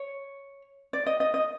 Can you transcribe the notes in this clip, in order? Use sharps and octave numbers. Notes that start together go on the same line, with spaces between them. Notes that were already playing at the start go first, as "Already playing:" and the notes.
Already playing: C#5
D5
D#5
D#5
D#5